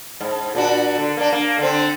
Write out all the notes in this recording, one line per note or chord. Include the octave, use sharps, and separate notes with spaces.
G#2
A#2 D4 F#4
D3
A#3 D4
A#3
D3 C4